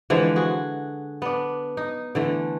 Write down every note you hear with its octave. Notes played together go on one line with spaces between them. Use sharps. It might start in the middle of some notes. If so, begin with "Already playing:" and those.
D3 E3 F3 G#3
F#4 G#4
B3 D4
D#4
D3 E3 A3